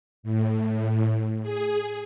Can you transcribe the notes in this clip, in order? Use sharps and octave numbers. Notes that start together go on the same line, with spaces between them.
A2
G#4